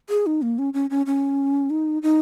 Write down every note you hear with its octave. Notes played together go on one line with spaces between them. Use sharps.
G#4
D#4
A#3
C#4
C#4
C#4
C#4
D#4
D#4